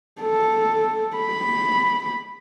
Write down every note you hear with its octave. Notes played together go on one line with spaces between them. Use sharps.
A4
B5